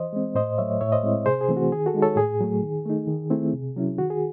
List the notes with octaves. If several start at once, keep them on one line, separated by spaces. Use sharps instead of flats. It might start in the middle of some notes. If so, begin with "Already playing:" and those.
Already playing: E3 C5 D#5
G#3 C4
A2 C5 D#5
F#3 A3 C#5 E5
A2 C#5 E5
C5 D#5
G#3 C4 E4
C3 G#4 C5
G#4
E3 A3 C4
F#4
D#3 G#4
F#4 A4
G#3 D#4
A4 C#5
A2 G#4
F#3 A3
D#3
A3 D#4
D#3
A3 C4 E4
C3
F#3 C#4 E4
D#3 F#4
G#4